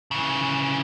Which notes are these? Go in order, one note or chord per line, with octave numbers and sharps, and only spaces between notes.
C#3 E3